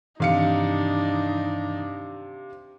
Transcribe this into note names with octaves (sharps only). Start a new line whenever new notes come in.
G2 C3 D#3 E3 D4 D#4 F5 C#7